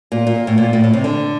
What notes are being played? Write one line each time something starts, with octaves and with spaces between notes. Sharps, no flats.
A#2
A#2
A2
A#2
A2
A2
C3
D3